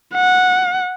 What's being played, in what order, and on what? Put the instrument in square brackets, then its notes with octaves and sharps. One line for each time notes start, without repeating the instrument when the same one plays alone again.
[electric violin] F#5